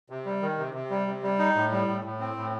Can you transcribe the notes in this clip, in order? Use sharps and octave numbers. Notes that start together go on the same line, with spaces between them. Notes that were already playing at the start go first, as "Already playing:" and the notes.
C3
G3
D#3
C3
C3
G3
C3
G3
D#4
A2
G3
A2
A2
C4
A2